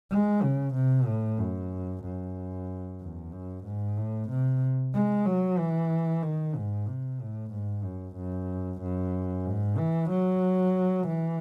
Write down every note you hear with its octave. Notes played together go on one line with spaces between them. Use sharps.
G#3
C#3
C3
A2
F#2
F#2
E2
F#2
G#2
A2
C3
G#3
F#3
E3
D#3
G#2
C3
A2
G#2
F#2
F#2
F#2
G#2
E3
F#3
E3